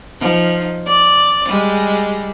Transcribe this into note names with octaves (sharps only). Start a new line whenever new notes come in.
F3 D#4
D5
G3 G#3